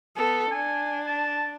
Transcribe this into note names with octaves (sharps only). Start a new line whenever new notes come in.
B3 A4
D4 G#5
A5